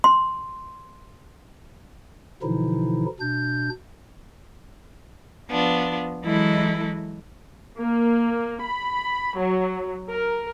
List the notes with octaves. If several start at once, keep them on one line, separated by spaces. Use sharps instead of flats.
C6
B2 D3 E3 F3 D#4 E4
B2 D4 G6
F3 B3 D4 F4
E3 F#3 G#3 E4 A4 D#5
A#3
B5
F#3
A#4